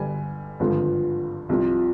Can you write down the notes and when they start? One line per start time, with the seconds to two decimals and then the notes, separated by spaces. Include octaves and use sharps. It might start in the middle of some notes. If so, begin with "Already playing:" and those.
Already playing: G1 D3 G3 G#5
0.60 G#1 G2 D3 F3
1.49 C2 C3 F3